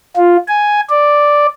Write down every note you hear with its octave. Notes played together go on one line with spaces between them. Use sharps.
F4
G#5
D5